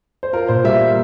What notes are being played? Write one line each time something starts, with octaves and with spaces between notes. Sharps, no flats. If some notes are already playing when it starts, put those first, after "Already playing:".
C5
F4 A#4
A#2 C5
G3 E5
A#3